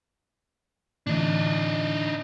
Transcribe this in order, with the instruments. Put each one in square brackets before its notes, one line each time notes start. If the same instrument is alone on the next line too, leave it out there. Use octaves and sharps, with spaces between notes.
[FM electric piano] A2 D3 E3 [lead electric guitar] D4 D#4